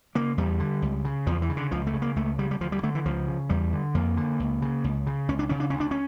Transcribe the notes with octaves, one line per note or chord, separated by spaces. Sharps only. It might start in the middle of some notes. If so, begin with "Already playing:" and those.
C#3 A#3
E2 G3
D3
C#2
C#3
E2 F3
E3
C#3
D3
C#2 F3
A3
C#3
A#3
C#2 A3
C#3 G3
G3
D2 F3
G3
D3 A3
E3
C#2 F3
C#3
E2 G3
D3
F2 A#3
D3
C#2
C#3
C#2
C#3
C#2 C#4
D4
C#3 C#4
D4
D2 C#4
D4
C#4